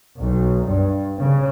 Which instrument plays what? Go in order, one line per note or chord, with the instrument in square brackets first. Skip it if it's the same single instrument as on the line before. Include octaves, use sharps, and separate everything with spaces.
[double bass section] B1
G2
C#3